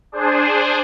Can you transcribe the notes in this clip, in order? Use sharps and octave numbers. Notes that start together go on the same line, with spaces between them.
D4 G#4 C5